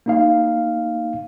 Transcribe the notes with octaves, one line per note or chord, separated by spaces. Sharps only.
A#3 D#4 F5